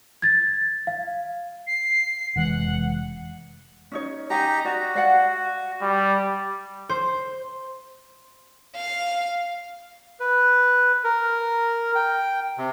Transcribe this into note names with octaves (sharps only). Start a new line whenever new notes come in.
G#6 A6
F5
C7
F1 E3 G#3 F#5
C#4 D#4 C#5
D#4 G4 G5 G#5 A#5
F#4 D5
D5 F5 F#5
G3
C5
F5
B4
A#4
G5
C3